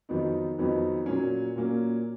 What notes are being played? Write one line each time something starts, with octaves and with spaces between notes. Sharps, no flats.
F2 D#3 F#3 B3 D#4
F2 D#3 F#3 B3 D#4
A#2 F#3 A#3 C#4
A#2 F#3 A#3 C#4